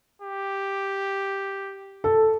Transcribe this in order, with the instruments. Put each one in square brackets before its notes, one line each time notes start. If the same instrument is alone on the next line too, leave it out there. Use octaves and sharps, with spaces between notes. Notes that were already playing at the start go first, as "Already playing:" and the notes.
[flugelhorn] G4
[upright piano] A4